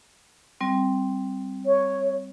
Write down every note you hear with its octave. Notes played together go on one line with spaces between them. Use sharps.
G3 C4
C#5